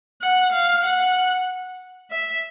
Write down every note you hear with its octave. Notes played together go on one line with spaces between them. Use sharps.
F#5
F5
F#5
E5